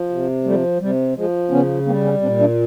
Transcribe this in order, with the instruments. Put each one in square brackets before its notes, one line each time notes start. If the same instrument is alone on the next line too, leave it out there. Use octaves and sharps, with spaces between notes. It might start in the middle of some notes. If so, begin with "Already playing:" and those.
Already playing: [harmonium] F3
C3
F3 G3 A3
C3 G3
F3 G#3
C#3 B3 C#4
G3 A#3 C4
B3 C#4
A#2 C4 D4
D4 E4